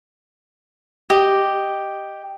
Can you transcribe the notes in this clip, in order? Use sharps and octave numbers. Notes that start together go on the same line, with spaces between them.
G4 D#5